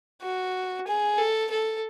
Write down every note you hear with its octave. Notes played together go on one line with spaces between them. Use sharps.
F#4
G#4
A4
A4